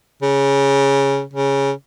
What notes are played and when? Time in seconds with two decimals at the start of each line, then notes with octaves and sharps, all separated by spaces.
0.23 C#3
1.33 C#3